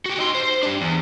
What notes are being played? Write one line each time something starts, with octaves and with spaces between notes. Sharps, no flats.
F#4 G4
D#4 C6
C5
D4 G4
E2